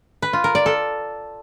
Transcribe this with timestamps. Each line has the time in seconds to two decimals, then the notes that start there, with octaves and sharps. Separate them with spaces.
0.22 B4
0.33 F4
0.44 A#4
0.55 D5
0.66 A4